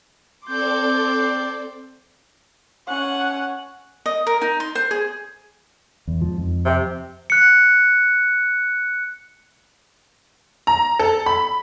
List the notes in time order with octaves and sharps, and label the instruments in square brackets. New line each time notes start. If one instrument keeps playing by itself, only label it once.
[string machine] C4 A4 D5 [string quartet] C6 D6 G6
[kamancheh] C#4 F#5
[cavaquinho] D#5
A#4
D#4
C6
C5
G#4
[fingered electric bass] E2
G#2 F3
F2
[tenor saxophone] C3
[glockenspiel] F#6 C#7
[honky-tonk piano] A#5
A4
B5